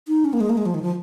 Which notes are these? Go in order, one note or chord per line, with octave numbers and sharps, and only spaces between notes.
D#4
C#4
A#3
G#3
A#3
G#3
F3
D#3
F3